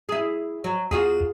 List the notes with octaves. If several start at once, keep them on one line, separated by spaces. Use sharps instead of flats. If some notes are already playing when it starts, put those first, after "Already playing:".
E4 G#4
F#3
E2 F4 F#4 G#4